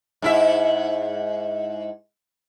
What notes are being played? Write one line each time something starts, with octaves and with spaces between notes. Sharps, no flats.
G#2 E4 E5